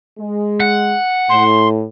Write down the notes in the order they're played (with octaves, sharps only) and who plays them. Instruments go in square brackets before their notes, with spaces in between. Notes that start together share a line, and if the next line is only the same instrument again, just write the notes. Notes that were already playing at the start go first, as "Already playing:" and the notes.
[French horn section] G#3
[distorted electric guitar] F#5
[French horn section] A2 [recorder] C6